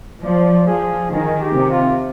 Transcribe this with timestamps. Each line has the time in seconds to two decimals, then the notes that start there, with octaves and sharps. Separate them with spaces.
0.23 F3 D5
0.67 F3 G#4
1.11 D#3 G#4
1.41 G4
1.55 C3
1.70 F4